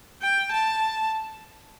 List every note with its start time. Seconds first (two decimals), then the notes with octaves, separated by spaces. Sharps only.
0.22 G5
0.52 A5